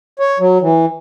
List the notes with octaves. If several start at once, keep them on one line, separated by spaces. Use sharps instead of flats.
C#5
F#3
E3